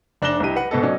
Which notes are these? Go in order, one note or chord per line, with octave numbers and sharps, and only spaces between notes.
F1 D4 F#6 A#6 E7 G7
C2 D#4 E4 G4 D#7
B4 F#5
G#2 B2 B3 D#4 A4
F#3 C#4 D#4 D5